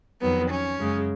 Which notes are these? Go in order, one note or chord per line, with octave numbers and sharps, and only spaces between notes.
F2 D#3 F#3 B3
C#4
F#2 C#3 G#3